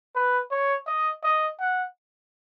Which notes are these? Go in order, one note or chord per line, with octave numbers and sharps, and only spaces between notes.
B4
C#5
D#5
D#5
F#5